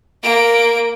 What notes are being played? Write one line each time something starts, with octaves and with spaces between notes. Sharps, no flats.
A#3 D7